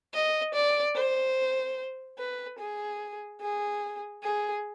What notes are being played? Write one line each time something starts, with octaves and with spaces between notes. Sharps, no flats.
D#5
D5
C5
B4
G#4
G#4
G#4